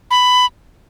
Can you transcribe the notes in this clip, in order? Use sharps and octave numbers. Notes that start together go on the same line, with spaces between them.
B5